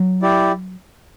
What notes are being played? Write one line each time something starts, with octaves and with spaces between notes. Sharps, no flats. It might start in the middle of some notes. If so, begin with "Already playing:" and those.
Already playing: F#3
E4 G4 D5